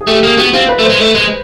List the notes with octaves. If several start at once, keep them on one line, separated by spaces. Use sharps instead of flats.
G#4
A3 G4
A#3 G#4
B3 F#4
C4 F4
B4
A3
C5
G#3
A3
G#3